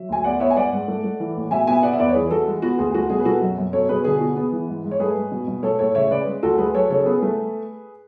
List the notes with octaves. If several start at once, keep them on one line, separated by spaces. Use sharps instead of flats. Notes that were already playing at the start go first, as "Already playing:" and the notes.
Already playing: F#3 E5
D2 G#5
B3 D5 F#5
B3 C#5 E5
G#5
G#2 D5 F#5
G#2
A3
A3
E3
A2
B2 E5 G#5
B3 E5 G#5
B3 D5 F#5
E5
E2 B4 D5
C#5
E3 G#4 B4
E3 F#4 A4
G#3
B3 F#4
D2 G#4
A3 F#4
B2 G#4
B4
B2 F#4 A4
F#2
F#2
B2 A4 C#5
B2 G#4 B4
D3 G#4
B3 F#4
B3 G#4
E3
G#2
G#2
C#5
A3 G#4 B4
G#2
B2
B2
A3 A4 C#5
A2 A4 C#5
C#3 C#5 E5
C#3 B4 D5
G#3
D2 F#4 A4
A3 G#4 B4
F#3 A4 C#5
C#3 A4 C#5
A4
B3 G#4 B4
A3